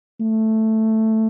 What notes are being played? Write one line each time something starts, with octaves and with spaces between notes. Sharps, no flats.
A3